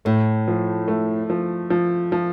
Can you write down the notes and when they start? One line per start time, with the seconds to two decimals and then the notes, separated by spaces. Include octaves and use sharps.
0.05 A2 A3
0.48 F3
0.88 A3
1.30 F3
1.70 F3
2.12 F3